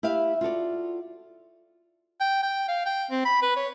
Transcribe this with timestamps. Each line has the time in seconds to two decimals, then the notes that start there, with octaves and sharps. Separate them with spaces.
0.03 E4 G4 E5 F5
0.41 F4 F#4 A4 D5
2.21 G5
2.43 G5
2.68 F5
2.86 G5
3.11 C4
3.25 B5
3.42 B4
3.56 C#5